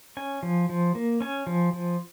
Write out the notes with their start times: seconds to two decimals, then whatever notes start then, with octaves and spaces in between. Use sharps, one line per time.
0.17 C#4 G#5
0.43 F3
0.69 F3
0.95 A#3
1.21 C#4 G#5
1.47 F3
1.73 F3